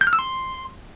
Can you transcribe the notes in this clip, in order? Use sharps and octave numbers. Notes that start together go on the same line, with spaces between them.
G6
F6
E6
C6